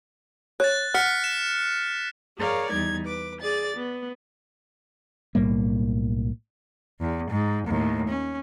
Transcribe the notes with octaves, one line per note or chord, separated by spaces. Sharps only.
C#5 F#6 A6
F#5 F6 B6 C#7
E7
G#4 A#4 C#5 D5 F5
E2 G3 D#4 G#6
B4 D6
G#4 D5 A6
B3
B1 A2 G3 A#3
E2
G#2
D#2 A2
C#4